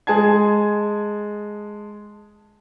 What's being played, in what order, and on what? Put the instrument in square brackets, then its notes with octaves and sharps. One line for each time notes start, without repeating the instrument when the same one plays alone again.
[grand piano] G#3 G#5 A5 G#6